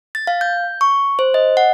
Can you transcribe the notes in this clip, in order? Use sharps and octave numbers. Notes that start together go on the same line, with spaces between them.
A6
F5
G6
C#6
C5
D#5
F#5